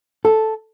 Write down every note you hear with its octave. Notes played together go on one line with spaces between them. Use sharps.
A4